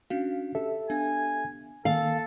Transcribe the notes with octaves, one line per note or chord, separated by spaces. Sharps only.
C#4 D4 F#4 F5
G4 A4 E5
B3 D4 F5 G#5
D#3 A#3 A4 F5 G#5